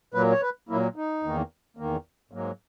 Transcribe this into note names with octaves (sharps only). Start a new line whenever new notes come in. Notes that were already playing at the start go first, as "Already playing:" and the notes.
A#2 F#3 A#3 B4
C#5
B4
A#2 F#3 A#3 E4
D#4
E2 D#3 A#3
E2 D#3 A#3
G#2 F#3 A#3